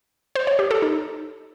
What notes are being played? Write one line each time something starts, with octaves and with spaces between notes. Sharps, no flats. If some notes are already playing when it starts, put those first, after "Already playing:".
C5
C#5
G4
A4
D#4